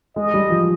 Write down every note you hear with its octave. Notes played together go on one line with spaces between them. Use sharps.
G#3 D#5
G3
F3